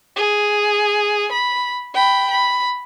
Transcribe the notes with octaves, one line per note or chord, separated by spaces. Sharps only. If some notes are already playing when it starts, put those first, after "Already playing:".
G#4
B5
G5 B5
B5